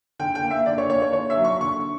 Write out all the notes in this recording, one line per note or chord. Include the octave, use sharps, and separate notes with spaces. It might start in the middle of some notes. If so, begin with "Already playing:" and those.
D3 G5
G5
A#3
E5
D3 D5
C#5
A#3 C#5
C#5
D3 C#5
E5
F#3 A#3
C#6
D3 C#6